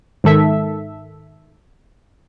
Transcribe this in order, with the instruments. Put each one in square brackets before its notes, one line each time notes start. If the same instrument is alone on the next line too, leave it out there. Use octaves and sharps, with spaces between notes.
[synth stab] G#2 D#3 A4 E5